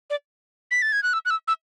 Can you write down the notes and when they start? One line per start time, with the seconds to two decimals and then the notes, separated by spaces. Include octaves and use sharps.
0.10 D5
0.71 B6
0.82 A6
0.92 G#6
1.03 F#6
1.13 E6
1.25 F#6
1.30 E6
1.48 E6